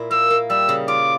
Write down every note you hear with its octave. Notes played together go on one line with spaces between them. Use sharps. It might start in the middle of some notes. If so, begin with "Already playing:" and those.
Already playing: A#2 E4
A#3 E6
A#3
G3 E6
C#3
F4 D6